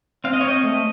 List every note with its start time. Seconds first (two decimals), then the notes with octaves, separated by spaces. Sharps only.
0.24 C4 F5
0.33 D#5
0.41 C#5
0.44 C4 D#5
0.64 A3